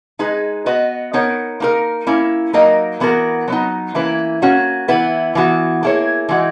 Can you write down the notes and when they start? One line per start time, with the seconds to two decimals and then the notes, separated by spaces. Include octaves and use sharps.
0.19 G#3 D#4 G#4 B4
0.66 B3 F#4 B4 D#5
1.13 B3 D#4 A#4 C#5
1.60 A#3 D#4 A#4
2.07 A#3 C#4 E4
2.53 F#3 A#3 D#4 A#4 D#5
3.00 E3 B3 F#4 A#4
3.48 F#3 B3 D#4
3.95 E3 A#3 C#4 E4 B4
4.42 A#3 C#4 F#4
4.88 E3 B3 E4 B4
5.35 E3 B3 F#4
5.83 A#3 E4 G#4 C#5
6.29 E3 G#3 D#4 F#4